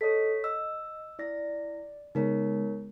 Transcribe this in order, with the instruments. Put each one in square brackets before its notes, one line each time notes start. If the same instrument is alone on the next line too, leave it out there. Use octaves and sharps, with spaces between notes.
[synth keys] A4 D#5 D#6 [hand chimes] C#5 B6
[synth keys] D#5 [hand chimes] E6
[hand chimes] E4 A#6 [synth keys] D5
[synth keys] C#3 G#3 B3 [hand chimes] D#4 A#4 C#5